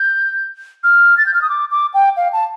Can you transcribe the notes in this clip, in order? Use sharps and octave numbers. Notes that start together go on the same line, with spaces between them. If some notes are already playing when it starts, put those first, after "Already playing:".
Already playing: G6
F6
A6
G6
F6
D#6
D6
D6
G5
F5
A5